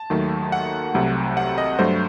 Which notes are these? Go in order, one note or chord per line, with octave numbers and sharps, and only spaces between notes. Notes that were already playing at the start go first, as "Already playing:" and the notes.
Already playing: A5
D#2 D#3 F#3 A3
F#5
C2 C3 F#3 A3
F#5
D#5
G2 F#3 A3 C5